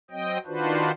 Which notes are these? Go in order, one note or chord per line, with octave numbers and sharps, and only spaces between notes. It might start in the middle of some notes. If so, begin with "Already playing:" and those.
F#3 C4 D#5 G5
D#3 D4 F4 F#4 B4 C5